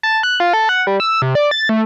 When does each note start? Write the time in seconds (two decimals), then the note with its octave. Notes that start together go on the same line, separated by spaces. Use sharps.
0.03 A5
0.23 F#6
0.40 F4
0.53 A4
0.69 F#5
0.87 G3
1.00 E6
1.22 C3
1.35 D5
1.51 A6
1.69 A3